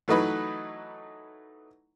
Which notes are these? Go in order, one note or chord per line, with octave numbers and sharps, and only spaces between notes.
E3 F#3 A3 D#4 B4